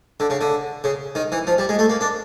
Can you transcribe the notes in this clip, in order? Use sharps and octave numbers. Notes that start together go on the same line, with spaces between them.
D3
C#3
D3
C#3
D#3
E3
F3
G3
G#3
A3
A#3
D4